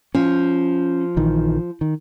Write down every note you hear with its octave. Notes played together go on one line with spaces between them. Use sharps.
F3 C#4
A#1 D#3 E3
D#3